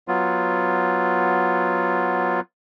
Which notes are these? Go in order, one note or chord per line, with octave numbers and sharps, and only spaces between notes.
F#3 B3 F4